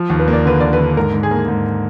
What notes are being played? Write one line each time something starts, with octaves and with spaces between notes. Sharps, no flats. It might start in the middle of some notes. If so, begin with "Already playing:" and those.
Already playing: F3
D#2
B4
A#3
D5
D3 B4
D3 D5
B4
D3
G#2 A#4
G#2
G#4
A#3
G#2